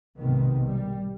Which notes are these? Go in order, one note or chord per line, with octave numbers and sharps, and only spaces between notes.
B1 G#2 C3 D#3 B3
G3